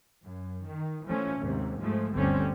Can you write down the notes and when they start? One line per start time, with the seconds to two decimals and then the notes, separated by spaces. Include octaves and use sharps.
0.24 F#2
0.67 D#3
1.07 E3 F3 A3 C#4
1.39 D#2 G#2 C3
1.80 G#2 F3 G#3 A3
2.14 G1 D2 D3 G3 C4 C#4